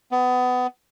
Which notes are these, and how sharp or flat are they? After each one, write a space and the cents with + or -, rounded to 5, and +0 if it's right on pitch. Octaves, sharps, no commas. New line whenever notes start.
B3 +25